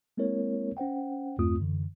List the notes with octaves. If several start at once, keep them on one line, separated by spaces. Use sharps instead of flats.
G#3 A#3 C4 E4 A#4 C#5
C#4 C5 F#5 G5
E2 G2 A3 C4 F4 D#6
F#2 D3 E3